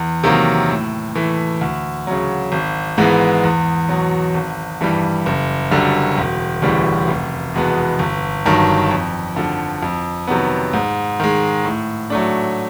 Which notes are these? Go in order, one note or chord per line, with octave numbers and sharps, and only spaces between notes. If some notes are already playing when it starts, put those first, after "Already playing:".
Already playing: E2
C3 D#3 F#3 A#3
A2
E3 A3
D2
C#3 F#3
G#1
G#2 E3 G#3 B3
E2
B2 F#3
G#1
G2 E3 G3
F#1
F#2 D3 G3
E1
D2 C#3 E3 G3
F1
E2 B2 G#3 B3
G1
G2 D#3 F#3
F2
D3 F3
F2
C3 D#3 F#3 B3
G#2
D#3 G#3
A2
F#3 A3 D4